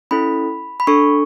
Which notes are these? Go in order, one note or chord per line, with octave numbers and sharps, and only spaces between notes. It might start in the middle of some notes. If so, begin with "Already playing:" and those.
C#4 E4 A4 B5
B5
D4 A4 C#6